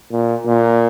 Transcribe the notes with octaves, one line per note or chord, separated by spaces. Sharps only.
A#2
A#2